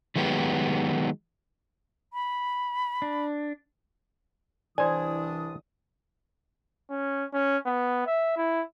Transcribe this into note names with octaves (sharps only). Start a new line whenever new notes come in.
D#3 F#3 G#3 B3 G4
B5
D4
C2 E3 D4 C5 D5 G#5 D#6
C#4
C#4
B3
E5
E4